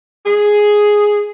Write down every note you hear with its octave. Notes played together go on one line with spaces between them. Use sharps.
G#4